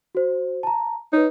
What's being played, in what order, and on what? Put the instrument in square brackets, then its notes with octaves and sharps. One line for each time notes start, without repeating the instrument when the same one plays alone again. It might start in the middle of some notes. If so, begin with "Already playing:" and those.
[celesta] F#4 C5
A5 A#5
[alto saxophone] D#4 [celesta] B4 C#5